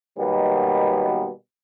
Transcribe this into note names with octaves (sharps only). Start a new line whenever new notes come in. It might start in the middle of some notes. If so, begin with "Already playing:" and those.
B2 D#3 F#3 G3 A#3 B3